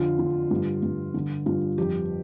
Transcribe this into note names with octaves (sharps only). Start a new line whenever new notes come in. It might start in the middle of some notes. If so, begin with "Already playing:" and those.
Already playing: F2 D3 F4
D3
G2
G2
D3
G2 F4
F2 G4